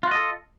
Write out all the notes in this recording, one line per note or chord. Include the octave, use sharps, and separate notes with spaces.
F4 F#4 A4 D#5